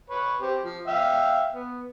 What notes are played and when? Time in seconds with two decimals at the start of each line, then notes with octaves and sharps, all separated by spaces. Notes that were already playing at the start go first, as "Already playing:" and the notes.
0.10 B4 C#5
0.41 C4 G4
0.64 F3
0.87 E5 F5 G5
1.52 B3